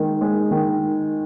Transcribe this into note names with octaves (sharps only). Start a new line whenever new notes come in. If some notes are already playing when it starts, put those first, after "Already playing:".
Already playing: D#3 G#3
G#3
D#3